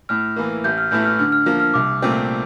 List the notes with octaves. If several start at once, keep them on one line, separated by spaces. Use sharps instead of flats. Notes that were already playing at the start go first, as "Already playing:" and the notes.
A2 F6
E3 A#3
A1 G6
F6
A2 E3 A3 E4 G6
F6
D3 F6
F6
F3 A#3
F6
C2 D6
A#2 A3 C4